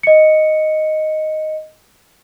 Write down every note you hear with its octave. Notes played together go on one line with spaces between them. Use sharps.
D#5 C#7